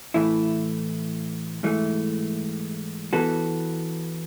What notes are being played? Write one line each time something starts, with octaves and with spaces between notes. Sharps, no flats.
A2 E3 A3 E4
G#2 E3 A3
E3 B3 F#4 A4